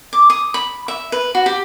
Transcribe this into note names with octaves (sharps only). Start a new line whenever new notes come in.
D6
D#6
B5
E5
B4
F#4
G4